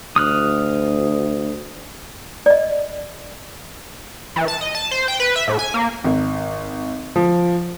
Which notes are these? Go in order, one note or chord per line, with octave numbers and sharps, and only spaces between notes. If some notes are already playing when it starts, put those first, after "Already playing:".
D2 D#6 F6 F#6
D5 D#5
E3
A5
D#5
A5
C5
G5
B4
E5
A2
G#5
A#3
G#1
F3